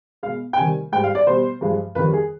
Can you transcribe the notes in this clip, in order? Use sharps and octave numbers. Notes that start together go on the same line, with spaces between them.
B2 G#3 F5
G5
C3 D#3 G3 G#5
G#2 G3 G5
F5
D5
B2 G3 C5
G2 F3 G#3
F2 D#3 G3 B4
G#4